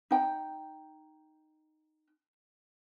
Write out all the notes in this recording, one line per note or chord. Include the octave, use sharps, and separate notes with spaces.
D#4 G5